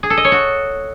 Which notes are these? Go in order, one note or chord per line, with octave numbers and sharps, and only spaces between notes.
G#4
A4
D#5
C#5
F#4